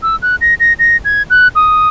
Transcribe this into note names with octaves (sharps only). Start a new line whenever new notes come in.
E6
F#6
A#6
A#6
A#6
G#6
F#6
D#6